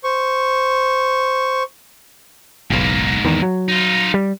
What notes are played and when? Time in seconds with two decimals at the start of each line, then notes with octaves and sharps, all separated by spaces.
0.04 C5 C#6
2.70 F#1 B1 G#2 A#3
3.25 E2 D#3
3.42 F#3
3.68 D#4 F4
4.14 G3